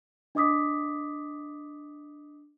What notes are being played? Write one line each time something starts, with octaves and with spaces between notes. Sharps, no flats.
D4 D#5 D6 D#6 B6